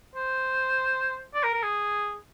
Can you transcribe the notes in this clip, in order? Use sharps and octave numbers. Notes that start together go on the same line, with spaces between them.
C5
D5
A#4
A#4
G#4